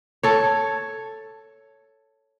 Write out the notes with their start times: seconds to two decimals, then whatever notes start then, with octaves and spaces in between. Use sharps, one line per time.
0.23 A4 C#5